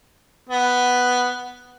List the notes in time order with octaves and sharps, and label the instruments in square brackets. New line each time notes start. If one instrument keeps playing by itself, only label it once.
[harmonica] B3